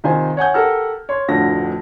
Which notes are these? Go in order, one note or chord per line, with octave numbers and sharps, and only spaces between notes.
C3 D#3 F4 C5 G#5
C#5 F#5 G#5 G6
G4 A4 A#4 F#5 A#5 F6
C#5 C6
F1 D2 A2 D3 F3 A#6